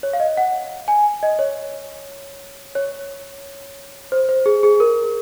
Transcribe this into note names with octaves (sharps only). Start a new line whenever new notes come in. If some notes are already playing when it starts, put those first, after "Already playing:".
C#5
F5
D#5
F#5
G#5
D#5
C#5
C#5
C5
C5
G#4
G#4
A#4